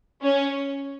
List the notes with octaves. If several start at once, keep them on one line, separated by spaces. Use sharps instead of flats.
C#4